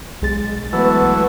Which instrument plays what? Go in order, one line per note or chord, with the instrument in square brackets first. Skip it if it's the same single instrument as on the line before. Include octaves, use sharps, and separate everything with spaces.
[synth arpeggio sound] B1 G#3 A6
[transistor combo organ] E3 F#3 A3 [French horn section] B3 B4